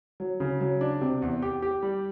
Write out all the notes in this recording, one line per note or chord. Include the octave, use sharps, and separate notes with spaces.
F#3
C#3
F#3
D4
C3
E2
G4
G4
G3